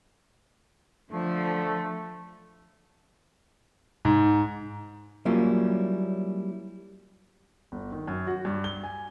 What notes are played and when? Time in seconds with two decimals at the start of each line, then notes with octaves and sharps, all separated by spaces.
1.12 D3 F3 A3
4.05 G#2
5.25 F#3 G3 A#3 C#4 E4 F4
7.72 G1
7.92 D#3
8.08 F#2
8.27 F#4
8.45 G2
8.64 G7
8.83 G#5